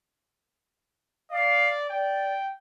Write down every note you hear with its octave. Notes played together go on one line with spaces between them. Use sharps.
D5 F5
D5 G5